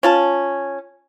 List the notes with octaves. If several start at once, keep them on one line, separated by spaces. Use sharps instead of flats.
C#4 F4 A5